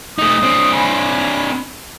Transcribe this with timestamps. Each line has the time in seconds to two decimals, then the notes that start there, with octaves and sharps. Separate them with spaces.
0.18 A3 D#4 D#6
0.43 C4 D4
0.73 G#5 B5